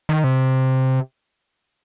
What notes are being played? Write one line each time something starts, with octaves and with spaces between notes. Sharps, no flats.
D#3
C3